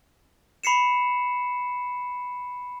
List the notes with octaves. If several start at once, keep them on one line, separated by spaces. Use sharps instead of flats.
B5 C7 C#7 E7